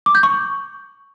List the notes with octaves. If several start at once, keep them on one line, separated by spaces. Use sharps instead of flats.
D6
G6
C#6